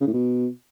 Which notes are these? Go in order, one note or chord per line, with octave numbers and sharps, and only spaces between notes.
C#3
A2
B2